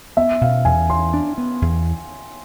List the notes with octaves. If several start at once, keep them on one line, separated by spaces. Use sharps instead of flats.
B3 E5
B2 F5
E2 G#5
E2 C6
D4
B3
E2